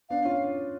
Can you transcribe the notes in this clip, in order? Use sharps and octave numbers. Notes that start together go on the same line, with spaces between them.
B3 D4 F5
C#4 F4